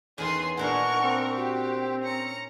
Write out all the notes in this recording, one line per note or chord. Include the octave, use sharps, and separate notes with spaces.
E2 D#3 E3 C#4 G#4 C6
A#2 D4 E4 A#4 F#5 G#5 C#6
C4
F#4 G4
C#4 A#5 C#7